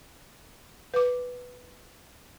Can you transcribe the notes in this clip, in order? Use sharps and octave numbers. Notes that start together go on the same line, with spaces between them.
B4 D6